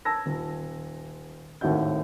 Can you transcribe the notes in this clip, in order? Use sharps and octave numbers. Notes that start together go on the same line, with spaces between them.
A5 E6 G#6 A#6
D#1
G#1 D#2 A2 F#4 E5 G6